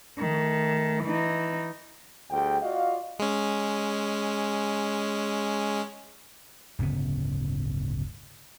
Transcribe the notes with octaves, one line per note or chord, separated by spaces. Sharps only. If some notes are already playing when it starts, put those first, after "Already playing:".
D#3 A3
E3 D#4
D2 G3 G#4 G5
F4 F#4 D5 D#5 F5
G#3 C#4
D1 G1 C#3 B3